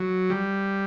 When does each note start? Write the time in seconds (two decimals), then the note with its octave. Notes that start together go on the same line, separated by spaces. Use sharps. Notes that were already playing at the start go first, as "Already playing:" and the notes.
Already playing: F#3
0.30 G3